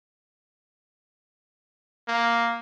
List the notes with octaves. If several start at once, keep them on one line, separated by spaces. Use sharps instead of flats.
A#3